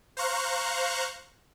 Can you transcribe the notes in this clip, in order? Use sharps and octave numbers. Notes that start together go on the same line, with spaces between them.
C5 F5 A#5 C#6 F#6